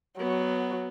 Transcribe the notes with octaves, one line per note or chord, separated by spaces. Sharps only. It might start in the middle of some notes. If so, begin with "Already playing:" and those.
F#3 B3